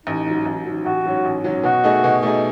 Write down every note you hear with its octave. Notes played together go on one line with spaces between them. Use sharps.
A1 D#4
G#2 F#3
A1
G#2 F#3
A1 F#4
G#2 F#3 C#4
A1
G#2 F#3 C#4
B2 F#4
A3 D#4 G#4
B2
A3 D#4 G#4